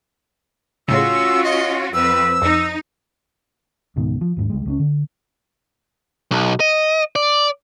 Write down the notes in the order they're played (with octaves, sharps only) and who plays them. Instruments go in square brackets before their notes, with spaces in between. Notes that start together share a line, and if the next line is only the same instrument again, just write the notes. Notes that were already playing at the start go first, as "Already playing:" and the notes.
[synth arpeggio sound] A2 C#3 [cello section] C#4 F4 F#4 [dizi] E6
[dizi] D#5
[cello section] F2 C4 B4 [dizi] E6
[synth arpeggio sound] F2 [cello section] D#4
[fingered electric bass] C#2 G#2 B2 D#3
F3
D#2 G#2
C#2 G3 G#3
C#2 A3 C#4
D3
[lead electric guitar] B1
D#5
D5